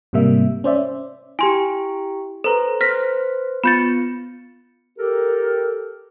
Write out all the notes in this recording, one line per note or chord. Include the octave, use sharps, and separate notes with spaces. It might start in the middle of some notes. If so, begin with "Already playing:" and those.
G#2 C3 G3 A#3 E5
C#4 C5 D5 E5
E4 G4 G#5 C6
A4 B4 C5 A#5
B4 C5 F6 A#6 B6
B3 F4 B5 G6 A6 C#7
G4 A4 A#4